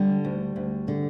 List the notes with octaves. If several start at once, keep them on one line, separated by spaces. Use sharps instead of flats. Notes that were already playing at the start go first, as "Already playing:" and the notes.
Already playing: D3 G3
D2
D2
D3